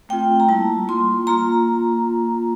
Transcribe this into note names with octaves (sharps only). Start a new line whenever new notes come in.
A3 C4 F4 G5
A#5
G3 A#3 E4 A5
A#3 F4 C6
A#3 F4 A#5